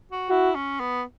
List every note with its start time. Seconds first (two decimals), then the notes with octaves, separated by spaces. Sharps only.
0.11 F#4
0.29 E4 F#4
0.55 C#4
0.80 B3